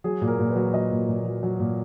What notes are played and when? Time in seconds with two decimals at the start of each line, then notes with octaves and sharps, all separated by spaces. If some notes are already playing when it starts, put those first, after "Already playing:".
0.04 F#3 G#4
0.22 A#2
0.28 A#4
0.39 A#2
0.50 B4
0.56 F#3
0.74 F#3 D#5
0.91 A#2
1.08 A#2
1.25 F#3
1.43 F#3
1.60 A#2